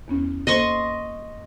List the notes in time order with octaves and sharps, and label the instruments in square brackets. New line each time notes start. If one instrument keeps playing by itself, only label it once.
[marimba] E2 B3 C#4
[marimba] A#3 A4 C5 [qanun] D#5 C6 C#6